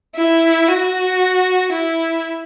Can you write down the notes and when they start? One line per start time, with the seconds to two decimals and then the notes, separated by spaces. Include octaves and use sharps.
0.16 E4
0.68 F#4
1.73 E4